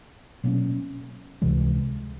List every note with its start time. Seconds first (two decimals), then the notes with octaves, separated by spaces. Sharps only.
0.43 B2 F#3 A#3 C#4
1.42 C#2 C3 E3 G#3